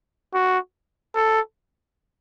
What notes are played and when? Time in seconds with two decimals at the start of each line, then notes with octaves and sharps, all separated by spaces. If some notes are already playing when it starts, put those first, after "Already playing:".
0.34 F#4
1.15 A4